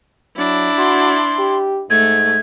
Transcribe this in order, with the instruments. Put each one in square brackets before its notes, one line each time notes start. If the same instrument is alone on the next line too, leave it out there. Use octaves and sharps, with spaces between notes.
[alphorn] F#3 [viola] D4 E4
[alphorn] F#4 [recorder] C6
[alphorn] G4
[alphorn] G#2 [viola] A3 [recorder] G#6